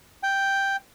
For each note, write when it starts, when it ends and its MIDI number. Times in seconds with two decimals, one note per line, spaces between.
0.23 0.76 79